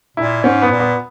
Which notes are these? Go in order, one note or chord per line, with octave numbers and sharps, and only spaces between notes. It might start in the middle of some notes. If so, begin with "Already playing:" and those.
A#2 E4
G#2 C#4
B3
A#2
B3